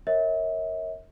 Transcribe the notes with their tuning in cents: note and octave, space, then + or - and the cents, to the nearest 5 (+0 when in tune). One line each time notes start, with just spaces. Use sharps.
A#4 +0 C#5 -10 E5 -40